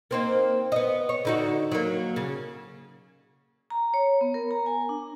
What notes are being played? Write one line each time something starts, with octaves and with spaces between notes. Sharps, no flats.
A#3 C4 D#4
B3 D#5
C#5
D3 D#4 F#4
F#3 A#3
C#3
A#5
C#5
B3
A#4
A#5
G#5
D4